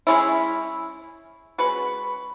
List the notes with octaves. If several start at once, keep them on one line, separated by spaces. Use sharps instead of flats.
G#3 C#4 E4
G#3 C#4 F#4 B4